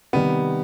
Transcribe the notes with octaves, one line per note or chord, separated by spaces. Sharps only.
C3 D#3 G3 B3